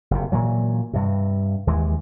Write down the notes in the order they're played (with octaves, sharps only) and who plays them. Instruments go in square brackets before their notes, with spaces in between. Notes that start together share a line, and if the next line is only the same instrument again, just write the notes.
[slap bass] F#1 C3
A#2 E3 F#3
G2 C3
D#2 E3 G#3